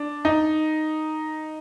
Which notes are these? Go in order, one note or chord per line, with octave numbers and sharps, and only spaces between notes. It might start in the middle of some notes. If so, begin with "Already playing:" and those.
Already playing: D4
D#4